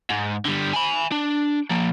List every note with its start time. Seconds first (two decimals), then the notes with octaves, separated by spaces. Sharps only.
0.10 G#2
0.45 D3 G3
0.74 G#5 B5
1.12 D4
1.70 F3 A#3